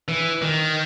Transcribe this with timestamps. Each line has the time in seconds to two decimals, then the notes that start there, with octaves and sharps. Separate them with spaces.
0.08 E3
0.42 D#3